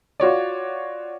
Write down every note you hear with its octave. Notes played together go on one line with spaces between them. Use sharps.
F4 F#4 C#5 D5